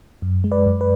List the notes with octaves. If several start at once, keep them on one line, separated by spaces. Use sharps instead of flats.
F#2
G#3
B4 D5
F#2
B4